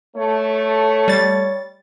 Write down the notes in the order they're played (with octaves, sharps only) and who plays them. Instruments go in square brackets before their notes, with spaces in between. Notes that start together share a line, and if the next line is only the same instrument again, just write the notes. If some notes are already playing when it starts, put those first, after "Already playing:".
[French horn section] A3 [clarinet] C#5
[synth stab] G3 A6